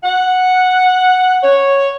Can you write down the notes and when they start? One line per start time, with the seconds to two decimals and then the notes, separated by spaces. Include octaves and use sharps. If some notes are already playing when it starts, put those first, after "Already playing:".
0.04 F#5
1.43 C#5